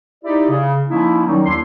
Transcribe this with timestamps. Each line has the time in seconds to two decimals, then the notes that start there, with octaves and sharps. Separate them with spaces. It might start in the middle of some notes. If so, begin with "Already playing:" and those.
0.24 D#4 E4 G4 D5
0.50 C#3
0.89 F3 A#3 C#4 D#4 E4
1.26 D#3 F#3 G3 C#4 D#4
1.46 D#2 D4 E4 C6